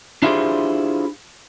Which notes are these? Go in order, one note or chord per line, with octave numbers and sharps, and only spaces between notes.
D4 E4 F4 G4 G#4 C5